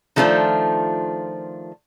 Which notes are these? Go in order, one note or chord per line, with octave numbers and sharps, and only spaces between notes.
D#3 F3 A3 D4 F4 C5